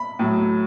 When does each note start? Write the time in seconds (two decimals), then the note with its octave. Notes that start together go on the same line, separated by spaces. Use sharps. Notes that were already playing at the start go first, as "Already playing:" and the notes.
Already playing: B5
0.19 A2 F#3 A3